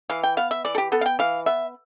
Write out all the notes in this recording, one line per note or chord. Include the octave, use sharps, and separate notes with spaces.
E3 F5
G5
B3 F5
E5
E3 D5
A4
G4
B3 A4
F5
G5
E3 F5
B3 E5